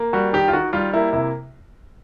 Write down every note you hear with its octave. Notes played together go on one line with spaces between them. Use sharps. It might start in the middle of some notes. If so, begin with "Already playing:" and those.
Already playing: A#3
G3 F#4
D#3 G4
F4
D#3 F#4
G3 F4
A#3 E4
C3 E4